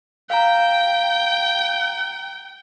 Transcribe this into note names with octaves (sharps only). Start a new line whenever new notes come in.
F5 G5 A#5